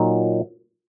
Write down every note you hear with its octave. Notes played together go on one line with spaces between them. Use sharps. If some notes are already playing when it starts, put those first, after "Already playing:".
Already playing: A#2 F#3 D#4